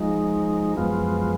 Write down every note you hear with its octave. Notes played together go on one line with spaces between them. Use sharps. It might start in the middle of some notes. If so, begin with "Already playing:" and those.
Already playing: F3 G#3 D#4
F#2 F3 G#3 B3 F4